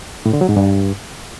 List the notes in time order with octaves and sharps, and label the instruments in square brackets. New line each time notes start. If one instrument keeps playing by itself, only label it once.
[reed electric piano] A2
D3
F#3
G#2
G2